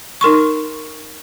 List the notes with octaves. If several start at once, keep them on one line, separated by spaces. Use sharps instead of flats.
D#4 A#4 C6 C#6